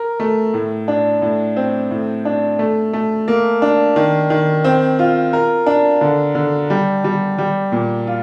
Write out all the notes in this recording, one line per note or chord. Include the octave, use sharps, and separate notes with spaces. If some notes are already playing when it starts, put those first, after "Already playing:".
Already playing: A#4
A3
A2
D4
A2
C4
A2
D4
A3
A3
A#3
D4
D#3
D#3
C4
F4
A#4
D4
D3
D3
G3
G3
G3
A#2
F4